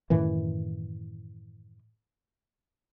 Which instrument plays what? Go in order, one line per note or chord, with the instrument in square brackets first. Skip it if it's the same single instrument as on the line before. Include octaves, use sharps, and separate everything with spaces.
[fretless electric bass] F#2 A2 D#3 E3